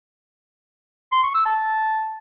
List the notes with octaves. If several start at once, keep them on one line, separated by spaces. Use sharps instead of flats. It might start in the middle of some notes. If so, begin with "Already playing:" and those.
C6
C#6
E6
A5